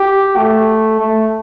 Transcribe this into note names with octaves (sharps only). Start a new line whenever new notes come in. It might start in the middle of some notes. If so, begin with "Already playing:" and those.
Already playing: G4
A3
A3